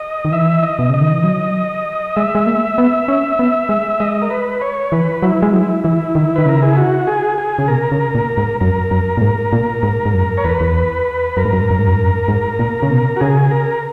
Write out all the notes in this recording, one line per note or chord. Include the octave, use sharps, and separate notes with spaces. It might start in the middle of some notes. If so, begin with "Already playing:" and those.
Already playing: D#5
D#3
E3 E5
D#5
B2
C#3 D#5
D#3
E3
F#3
G#3 E5
G#3
A#3
B3
C#4
B3
G#3
G#3 D#5
A#4
B4
C#5
E3 B4
F#3 E4
G#3
F#3 E4
E3 E4
D#3
D#3 B4
C#3 A#4
G#4
F#4
G#4
G#4
C#3
B2 A#4
C#3
A#2
G#2
F#2 A#4
F#2
A#2
G#2
A#2
G#2
G#2
F#2
C#5
E2 B4
E2
F#2 A#4
G#2
F#2
G#2
F#2
G#2
F#2
G#2
F#2
G#2
A#2
C#3
B2
F#4
C#3 G#4
A#4